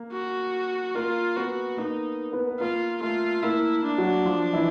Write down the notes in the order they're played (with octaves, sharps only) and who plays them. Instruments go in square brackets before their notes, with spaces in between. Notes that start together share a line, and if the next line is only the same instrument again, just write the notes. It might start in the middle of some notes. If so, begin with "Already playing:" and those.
Already playing: [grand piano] A#3
[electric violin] F#4
[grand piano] A#3 A#4 [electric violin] F4
[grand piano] B3 B4 [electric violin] F#4
[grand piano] A#3 A#4 [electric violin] D#4
[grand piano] B3 B4
B4
[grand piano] A#3 A#4 [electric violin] F4
[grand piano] A3 A4 [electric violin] F4
[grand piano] A#3 A#4 [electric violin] E4
[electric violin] D4
[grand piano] F#3 F#4
F3 F4
E3 E4